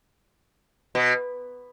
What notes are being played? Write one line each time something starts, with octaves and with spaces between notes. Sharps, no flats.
B2